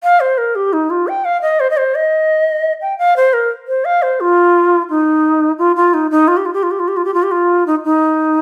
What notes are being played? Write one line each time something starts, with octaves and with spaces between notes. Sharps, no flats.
F5
C5
A#4
G4
D#4
F4
G5
F5
D#5
C5
D#5
C5
D#5
G5
F5
C5
A#4
C5
F5
C5
F4
D#4
F4
F4
D#4
D#4
F4
G4
F4
G4
F4
G4
F4
G4
F4
G4
F4
G4
F4
D#4
D#4